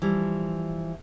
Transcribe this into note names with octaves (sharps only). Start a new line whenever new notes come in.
E3 F3 G3